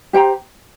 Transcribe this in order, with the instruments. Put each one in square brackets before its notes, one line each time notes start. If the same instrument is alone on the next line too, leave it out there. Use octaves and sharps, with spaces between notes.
[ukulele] G4 C5 G5 A#5